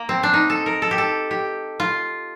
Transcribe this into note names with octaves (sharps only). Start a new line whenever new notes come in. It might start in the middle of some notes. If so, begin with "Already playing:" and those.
Already playing: A#3
C4
D4
D#4
A4
A#4
A4
G4
A4
G4
F4